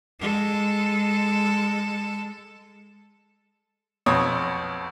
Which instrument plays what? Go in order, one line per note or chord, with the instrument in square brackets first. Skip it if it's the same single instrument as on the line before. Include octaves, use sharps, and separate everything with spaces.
[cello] G#3 A4
[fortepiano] B1 F2 C#5 D#6